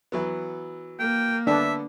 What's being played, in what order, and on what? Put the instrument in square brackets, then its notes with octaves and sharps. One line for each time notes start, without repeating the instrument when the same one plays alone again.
[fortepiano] E3 F#3 B3
[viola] A#3 [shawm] G5
[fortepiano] D3 B3 [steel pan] D4 [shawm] E5